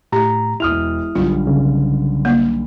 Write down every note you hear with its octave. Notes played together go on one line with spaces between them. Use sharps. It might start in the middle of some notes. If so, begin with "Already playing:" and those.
A2 G4 A#5
E1 E4 D#6 F6 F7
B1 G2 D3 F4
C#3
A#3